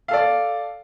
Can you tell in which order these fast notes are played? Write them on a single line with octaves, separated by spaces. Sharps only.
F5 A4 D5